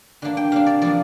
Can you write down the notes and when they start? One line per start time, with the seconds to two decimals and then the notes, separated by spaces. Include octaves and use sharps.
0.22 D3 A#3 D4
0.37 G5
0.52 C3 A#3 D4 F5
0.66 D5
0.82 F3 A#3 D4 D5